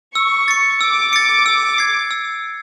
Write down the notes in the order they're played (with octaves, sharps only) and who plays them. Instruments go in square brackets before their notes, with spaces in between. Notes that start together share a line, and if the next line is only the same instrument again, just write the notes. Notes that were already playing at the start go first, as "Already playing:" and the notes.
[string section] C#6 [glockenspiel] E6
[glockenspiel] A6 C#7
[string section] D6 [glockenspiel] E6
[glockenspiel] A6 C#7
E6
G#6 C7
E6